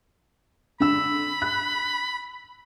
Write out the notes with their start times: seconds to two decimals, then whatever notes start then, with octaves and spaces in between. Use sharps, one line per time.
0.80 D3 B5 E6
1.42 F#6